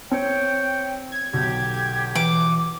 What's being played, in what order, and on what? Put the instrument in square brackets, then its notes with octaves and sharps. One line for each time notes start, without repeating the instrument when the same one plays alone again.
[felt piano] C4 [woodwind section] C#5 G5
[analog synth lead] G#6
[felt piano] B1 [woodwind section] D3 G4
[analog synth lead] E3 [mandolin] D6